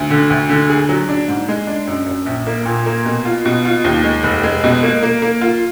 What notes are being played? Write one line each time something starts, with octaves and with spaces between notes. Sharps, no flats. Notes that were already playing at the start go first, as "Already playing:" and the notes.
Already playing: D2
D3
D2
D3
G#4
F#3
D4
G#2
G#3
D4
F#2
F#2
A#1
A#3
A#2
A#3
B2
F4
B2
F4
D#2
G#3
F1
G#3
B2
A#3
A#3
A#3
F4